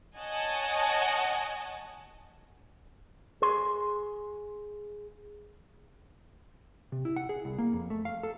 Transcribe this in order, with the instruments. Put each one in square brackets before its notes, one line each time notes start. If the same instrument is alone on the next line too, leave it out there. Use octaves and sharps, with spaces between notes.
[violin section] C#5 D#5 F#5 G#5 A5
[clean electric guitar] G#4 C6
[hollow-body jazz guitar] C3
E4
F#5
G#4
C2
A#3
F2
A3
F5
A4